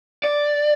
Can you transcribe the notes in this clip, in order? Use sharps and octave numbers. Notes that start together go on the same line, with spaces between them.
D5